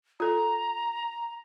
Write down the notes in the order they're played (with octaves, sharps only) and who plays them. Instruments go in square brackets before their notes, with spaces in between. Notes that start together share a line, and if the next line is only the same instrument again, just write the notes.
[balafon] F4 A4 [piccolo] A#5